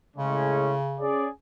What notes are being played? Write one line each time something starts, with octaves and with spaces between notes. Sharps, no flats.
A2 C#3 G#3 C#4
C#4 G#4 D5